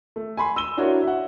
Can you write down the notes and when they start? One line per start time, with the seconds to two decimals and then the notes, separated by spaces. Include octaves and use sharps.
0.16 A3
0.37 G#5 B5 C6
0.56 E6 D#7 G7
0.77 D4 E4 F#4 A#4 C#5
1.03 E5 F#5